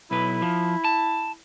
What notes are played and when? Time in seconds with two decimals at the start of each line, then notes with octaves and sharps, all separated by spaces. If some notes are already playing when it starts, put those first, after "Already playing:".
0.11 B1 E4 B4
0.42 F3
0.85 A5